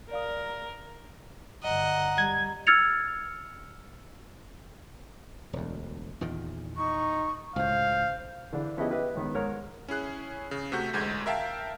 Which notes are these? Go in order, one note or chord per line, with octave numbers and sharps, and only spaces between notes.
A#4 D5 F5 D#6
G2 D3 D#5 F#5 A#5
G3 G#6
E6 F6 G#6 A6 C#7 F7
E1 D2
E2 A#2 D#3
D#4 C#6
C#2 A2 C5 F5
D3 E3 D4
F3 B3 C#4 E4 G4 D#5
G4 B4 D#5 E5
C#2 D#3 B3
G#2 A#4 C#5 F6
C#4 E4 G#4 F#6
C#3
C3 A3 F#4 G6
A1 D2 G#3 G6 G#6
A#4 E5 F5 G5 A5